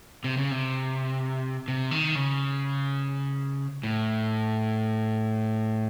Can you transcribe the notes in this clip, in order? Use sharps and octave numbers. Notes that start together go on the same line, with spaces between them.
C3
C#3
C3
C3
D#3
C#3
A2